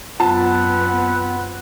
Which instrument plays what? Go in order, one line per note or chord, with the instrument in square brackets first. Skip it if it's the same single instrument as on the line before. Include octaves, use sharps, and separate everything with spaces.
[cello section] F#2 B3 [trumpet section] C4 B4 F#5 [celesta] F4 [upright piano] A5